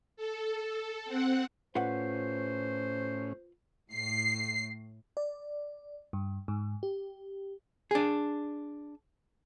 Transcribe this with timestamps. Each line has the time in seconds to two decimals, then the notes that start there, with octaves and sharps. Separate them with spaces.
0.17 A4
1.05 C4 F#5
1.75 A2 C#4 F4 B4 C5 F#5
3.91 A2 C7
5.17 D5
6.13 G2
6.48 G#2
6.83 G4
7.91 D4 G#4